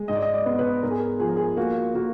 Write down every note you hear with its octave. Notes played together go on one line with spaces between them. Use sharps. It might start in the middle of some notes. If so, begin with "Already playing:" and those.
Already playing: G#3
G#2 D#5
D5
D#5
D5
B3
B4
G#2 A#4
G#4
A#4
F3 G#4
A#4
G#4
A#3 F#4
A#3 F#4